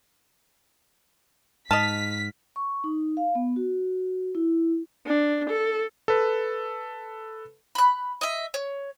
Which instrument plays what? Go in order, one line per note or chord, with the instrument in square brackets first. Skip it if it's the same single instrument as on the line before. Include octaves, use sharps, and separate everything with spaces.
[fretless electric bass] G#2 [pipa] D#5 A5 [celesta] F6 D#7 F7 [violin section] B6
[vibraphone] C#6
D#4
F5
B3
F#4
E4
[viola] D4
A4
[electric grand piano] A4 B4
[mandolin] B5 F#6
D#5 E5
C#5